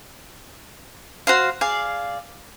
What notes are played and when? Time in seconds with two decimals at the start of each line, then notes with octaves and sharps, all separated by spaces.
1.27 F#4 C5 F5
1.61 G#4 D5 F5